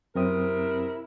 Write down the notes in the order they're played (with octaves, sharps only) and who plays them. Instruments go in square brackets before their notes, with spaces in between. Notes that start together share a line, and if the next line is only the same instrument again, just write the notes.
[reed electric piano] F#2 C4 D#6 [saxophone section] C3 E4 A#4